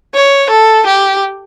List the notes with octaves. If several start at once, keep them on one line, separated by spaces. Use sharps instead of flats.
C#5
A4
G4